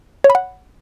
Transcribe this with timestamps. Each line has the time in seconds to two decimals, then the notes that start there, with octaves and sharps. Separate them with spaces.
0.24 C#5
0.30 B5
0.35 F#5